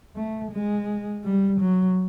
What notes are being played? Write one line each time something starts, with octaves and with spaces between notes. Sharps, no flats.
A3
G#3
G3
F#3